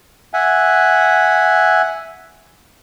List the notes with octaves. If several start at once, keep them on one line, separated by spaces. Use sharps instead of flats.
E5 F#5 G#5